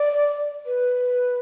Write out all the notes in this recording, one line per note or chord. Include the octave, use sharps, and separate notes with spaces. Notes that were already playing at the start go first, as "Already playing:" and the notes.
Already playing: D5
B4